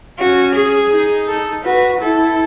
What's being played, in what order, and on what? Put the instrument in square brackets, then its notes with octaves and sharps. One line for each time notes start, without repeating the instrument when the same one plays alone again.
[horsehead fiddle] C#4 [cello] F#4
[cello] G#4
[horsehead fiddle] D#4
[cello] A4
[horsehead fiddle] F#4 [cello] B4
[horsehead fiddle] E4 [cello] A4